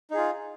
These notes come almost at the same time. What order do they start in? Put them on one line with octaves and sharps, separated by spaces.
D#4 G#4 F4